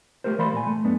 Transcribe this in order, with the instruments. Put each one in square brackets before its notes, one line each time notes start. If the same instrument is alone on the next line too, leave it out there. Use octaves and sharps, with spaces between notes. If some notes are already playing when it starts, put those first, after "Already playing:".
[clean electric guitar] A3 G4 A#4 C5
E3 D5 F5 B5 C6
A#2 G#5
A3
F#2 B3 D4